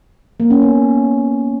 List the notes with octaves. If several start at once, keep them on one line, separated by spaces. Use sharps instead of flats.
A#3
C#4
B3